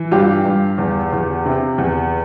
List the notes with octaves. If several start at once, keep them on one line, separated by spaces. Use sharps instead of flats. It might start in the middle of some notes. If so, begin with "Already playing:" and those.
Already playing: E3
G2 F4 G4
G2
E2
E2
C3
E2